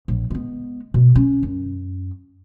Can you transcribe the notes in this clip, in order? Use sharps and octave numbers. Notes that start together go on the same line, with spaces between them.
A#1
G#3 B3
B2
C#4
F#2